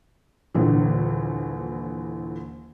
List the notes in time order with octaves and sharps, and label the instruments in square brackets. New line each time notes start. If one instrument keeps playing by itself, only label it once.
[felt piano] D#1 A#1 D3 E3